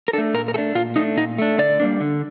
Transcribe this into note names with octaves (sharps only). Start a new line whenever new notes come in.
A#4
A3 D4 A4
A#2 A#4
A#4
A3 D4 A4
A#2 F4
A3 D4 D#4
A#2 D#4
A3 D4
D3 D5
G3 A#3 D4
D3